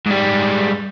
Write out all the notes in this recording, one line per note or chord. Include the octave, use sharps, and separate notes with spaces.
G#2 G3